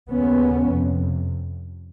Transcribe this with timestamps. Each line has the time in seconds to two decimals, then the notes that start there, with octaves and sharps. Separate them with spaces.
0.11 D#2 C#3 B3 C#4
0.68 F2 C3